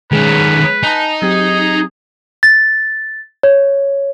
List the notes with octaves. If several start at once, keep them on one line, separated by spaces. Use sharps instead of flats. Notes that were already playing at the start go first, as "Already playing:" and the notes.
D#3 G#3 C#4 G#4 B4
D#4 G#5 A5
F#3 C4 G4 G#4
A6
C#5